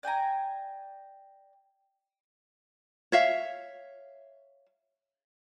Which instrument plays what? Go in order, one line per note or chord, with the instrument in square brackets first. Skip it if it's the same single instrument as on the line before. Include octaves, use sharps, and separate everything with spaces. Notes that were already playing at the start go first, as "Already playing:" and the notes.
[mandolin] D5 G5 G#5 A#5
[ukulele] C#5 E5 F5